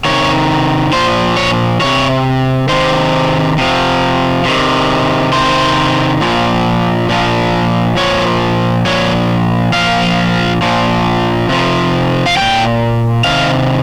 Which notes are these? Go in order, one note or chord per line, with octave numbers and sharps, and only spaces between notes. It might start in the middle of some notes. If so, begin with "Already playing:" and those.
C3 D#3 C#5
A#2 F3 C5
C#5
C3 D#3 C#5
C3 D#3 C5
C3 F3
C3 D#3
C3 D#3 C5
A#2 F3
A#2 F3
A#2 F3 C#5
A#2 F3 C#5
A#2 F3 F5
A#2 F3
C3 F3
F5
A#2 F3 G5
C3 D#3 F5